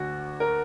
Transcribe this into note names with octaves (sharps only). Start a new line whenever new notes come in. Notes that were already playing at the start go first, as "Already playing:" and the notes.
Already playing: D2 D3 F#4
A#4